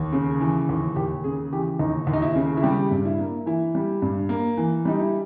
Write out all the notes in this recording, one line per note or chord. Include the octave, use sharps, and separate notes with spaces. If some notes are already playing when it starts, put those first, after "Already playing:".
Already playing: D#2
C#3
E3
D#2
D#2 G4
C#3 G#4
E3 G4
D#2 D#4
D#2
D#4
E4
C#3
E4
G3 G4
G2
E4
A#3
E3 E4
G3
G2
A#3
E3
G3 D#4
E4